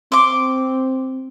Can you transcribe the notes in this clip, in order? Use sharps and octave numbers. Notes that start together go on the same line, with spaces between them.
C4 C6 D6